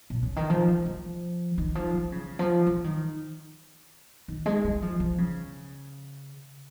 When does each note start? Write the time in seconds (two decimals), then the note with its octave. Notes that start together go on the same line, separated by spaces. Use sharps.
0.10 A#2
0.23 C#3
0.36 D#3
0.50 F3
0.68 F3
0.86 F3
1.58 D#3
1.75 F3
1.94 F3
2.12 C#3
2.39 F3
2.67 F3
2.84 D#3
4.28 D#3
4.46 G#3
4.64 G#3
4.82 F3
5.00 F3
5.18 C#3